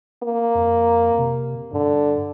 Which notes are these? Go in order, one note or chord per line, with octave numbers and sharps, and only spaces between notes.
A#3
F2
C3
G2 D3